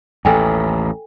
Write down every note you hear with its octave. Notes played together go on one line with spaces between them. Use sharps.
A1 D#2 A4 G5 G#5